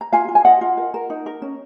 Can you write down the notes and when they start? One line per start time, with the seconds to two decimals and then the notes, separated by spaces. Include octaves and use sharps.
0.01 A#5
0.13 F4 F5 G#5
0.28 F4
0.35 G#5
0.45 F4 D#5 F#5
0.61 F4
0.77 A#4
0.94 A#4
1.10 D#4
1.26 A#4
1.42 C#4